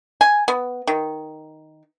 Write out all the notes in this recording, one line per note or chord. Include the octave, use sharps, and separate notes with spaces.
G#5
B3
D#3